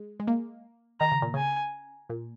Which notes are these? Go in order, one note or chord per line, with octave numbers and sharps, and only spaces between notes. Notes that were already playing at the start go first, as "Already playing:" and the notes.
Already playing: G#3
G#3
A#3
D#3 A#5
C#3
A#2
C#3 G#5
A#2